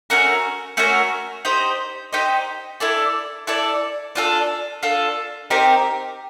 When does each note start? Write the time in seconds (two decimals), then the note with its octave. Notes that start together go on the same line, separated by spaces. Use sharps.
0.10 A3 C#4 F#4 A#4
0.77 A3 C#4 F#4 A#4
1.45 D#4 G4 C5 D#5
2.13 D#4 G4 C5 D#5
2.80 E4 A4 D5
3.47 E4 A4 D5
4.15 D4 F4 A4
4.83 D4 F4 A4
5.50 C4 D#4 G4 A#4